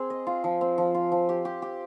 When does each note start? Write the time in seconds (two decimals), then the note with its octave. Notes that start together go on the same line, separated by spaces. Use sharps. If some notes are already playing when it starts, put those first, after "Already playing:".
Already playing: C4 G#4
0.10 D#5
0.27 F4
0.44 F3
0.61 C4
0.78 F3
0.95 F4
1.12 F3
1.29 G4
1.45 G4
1.62 G4